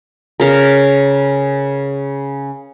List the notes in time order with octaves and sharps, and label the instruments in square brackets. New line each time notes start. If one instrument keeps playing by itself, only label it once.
[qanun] C#3 A#4